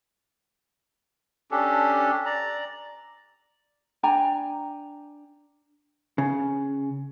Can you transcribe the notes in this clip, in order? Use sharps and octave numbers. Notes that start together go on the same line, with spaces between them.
C#4 D4 G4 A4
D5 A#5
D4 G5 G#5 A#5
C#3